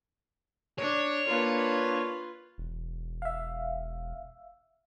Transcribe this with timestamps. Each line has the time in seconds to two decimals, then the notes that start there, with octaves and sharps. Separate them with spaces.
0.79 D4 C#5
1.27 A#3 D4 F4 B4
2.58 E1
3.22 E5 F5